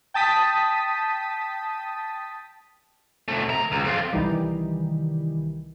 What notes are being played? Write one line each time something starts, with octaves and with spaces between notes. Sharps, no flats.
G5 A5 D#6 B6
C3 A3
D#3 A#5
C#2
F2 F4
C2 D#3 E3 G3